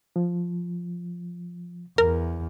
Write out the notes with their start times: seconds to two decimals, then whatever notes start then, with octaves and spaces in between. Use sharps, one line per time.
0.16 F3
1.98 E2 A#4